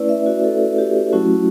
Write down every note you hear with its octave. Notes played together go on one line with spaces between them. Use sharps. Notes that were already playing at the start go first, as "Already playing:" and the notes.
Already playing: A3 C#4 E4 B4 D5
E5
F#4
A4
G4
F#3 A3 C#4 E4 F#4